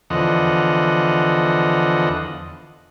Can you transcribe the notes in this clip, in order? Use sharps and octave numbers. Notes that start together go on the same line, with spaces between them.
E2 D3 F3 D#5 F#5